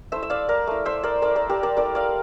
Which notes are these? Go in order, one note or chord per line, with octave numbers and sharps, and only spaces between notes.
A3 E4 C5 E5
E5
D5 F5
A#4 D5
A3 E4
C5 E5
A#4 D5
A3 E4 A#4 D5
A#4 D5
G4 A#4
A#4 D5
A3 E4 A#4 D5
D5 F5